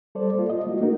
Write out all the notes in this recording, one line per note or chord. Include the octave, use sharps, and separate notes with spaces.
G3 A4 C5 D5
A#3 F4
D#5
G#3 A#3 E4 F#4
A3 A#3 D4 D#4 F#4 A#4